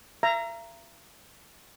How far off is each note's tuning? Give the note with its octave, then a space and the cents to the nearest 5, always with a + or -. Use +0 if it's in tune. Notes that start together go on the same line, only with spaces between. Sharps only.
E5 +45 A#5 +0